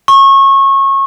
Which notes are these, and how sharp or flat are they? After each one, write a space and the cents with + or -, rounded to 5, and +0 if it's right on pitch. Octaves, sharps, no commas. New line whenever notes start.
C#6 -25